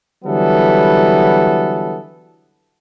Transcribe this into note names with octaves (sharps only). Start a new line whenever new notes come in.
D3 E3 F#3 G3 B3 A4